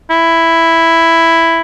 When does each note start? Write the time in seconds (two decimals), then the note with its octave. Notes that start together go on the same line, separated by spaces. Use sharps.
0.10 E4